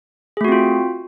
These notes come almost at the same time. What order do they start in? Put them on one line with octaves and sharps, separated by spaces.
G#4 A3 F#4 C4 F4